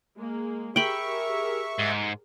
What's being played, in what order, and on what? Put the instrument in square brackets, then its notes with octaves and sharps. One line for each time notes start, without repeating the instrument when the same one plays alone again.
[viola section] G#3 A#3
[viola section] G4 G#4 A#4 [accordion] E5 C#6 [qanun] G5 B5
[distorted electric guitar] G#2